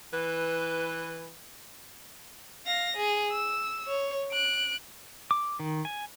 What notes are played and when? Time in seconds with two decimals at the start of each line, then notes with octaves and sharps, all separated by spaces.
0.13 E3 B4
2.66 F5 A#6
2.96 G#4
3.31 E6
3.88 C#5
4.32 F#6 D7
5.31 D6
5.60 D#3
5.85 G#5